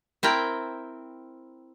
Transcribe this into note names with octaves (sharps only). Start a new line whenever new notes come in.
C4 E4 A#4 G5